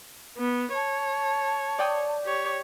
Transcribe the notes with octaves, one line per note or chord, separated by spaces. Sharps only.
B3
C#5 A5
D5 G5 D#6
G4 C#5